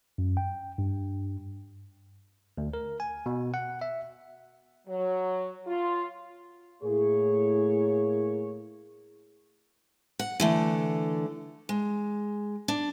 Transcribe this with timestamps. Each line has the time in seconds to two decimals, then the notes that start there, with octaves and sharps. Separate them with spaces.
0.18 F#2
0.37 G5
0.78 G2
2.58 D2
2.74 A#4
3.00 G#5
3.26 B2
3.54 F#5
3.81 E5
4.87 F#3
5.67 F4
6.82 A2 A#3 G#4 C#5
10.19 F#5
10.40 D3 E3 A3
11.69 G#3
12.68 D4